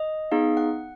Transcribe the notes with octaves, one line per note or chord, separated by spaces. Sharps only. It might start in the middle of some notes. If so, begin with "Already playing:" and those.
Already playing: D#5
B3 D#4 G#4 F5
F#5